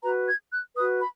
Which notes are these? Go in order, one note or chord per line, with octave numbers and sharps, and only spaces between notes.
F#4 B4 A#5
G#6
F#6
F#4 B4 D#6
B5